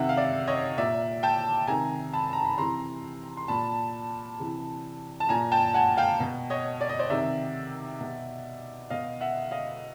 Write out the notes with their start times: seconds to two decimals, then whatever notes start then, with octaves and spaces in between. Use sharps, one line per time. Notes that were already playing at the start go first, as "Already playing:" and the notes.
Already playing: C3 D#3 E5 F#5
0.09 F5
0.17 D5 E5
0.48 C#5 D#5
0.77 A#2 D5 E5
1.23 G5 A5
1.67 C3 D#3 G#5 A#5
2.13 A5 B5
2.33 A#5
2.45 B5
2.58 C3 E3 A#5 C6
3.37 C6
3.48 A#2 A5 B5
4.40 C3 E3
5.20 A5
5.29 A#2 G#5 A#5
5.52 G5 A5
5.74 F#5 G#5
5.97 F5 G5
6.20 B2
6.50 C#5 D#5
6.81 D5
6.89 D#5
6.99 C5 D5
7.10 C3 D#3 D5 E5
8.01 B2
8.90 B2 D#5 F5
9.21 E5 F#5
9.51 D#5 F5